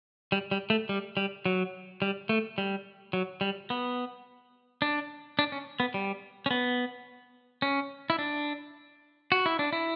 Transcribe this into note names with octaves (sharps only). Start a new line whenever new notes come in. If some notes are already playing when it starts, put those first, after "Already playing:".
G3
G3
A3
G3
G3
F#3
G3
A3
G3
F#3
G3
B3
D4
D4
C#4
B3
G3
C#4
B3
C#4
E4
D4
F#4
E4
D4
E4